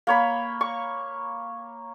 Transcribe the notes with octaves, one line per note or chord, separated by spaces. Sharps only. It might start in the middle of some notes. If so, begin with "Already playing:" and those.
A#3 C#5 B5
C#6